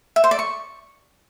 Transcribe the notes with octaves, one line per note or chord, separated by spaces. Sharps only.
E5
C5
D5
C#6